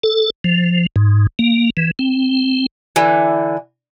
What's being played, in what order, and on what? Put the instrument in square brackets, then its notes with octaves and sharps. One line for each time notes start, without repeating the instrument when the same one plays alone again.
[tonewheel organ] A4
F3
G#2
A#3
E3
C4
[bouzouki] D3 E3